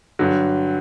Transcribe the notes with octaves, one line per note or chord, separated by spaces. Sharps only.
G2 D3 F#3